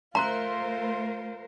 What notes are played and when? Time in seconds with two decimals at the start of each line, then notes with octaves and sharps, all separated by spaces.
0.15 A3 F4 A#4 C5 E5 A#5 C6 F#6